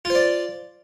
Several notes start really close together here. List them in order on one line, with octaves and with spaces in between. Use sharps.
F4 C5 D5